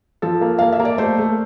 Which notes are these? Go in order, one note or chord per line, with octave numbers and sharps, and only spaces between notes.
F3 A4
A#3
A#3 F5
E5
A#3
D5
A3 C5
A3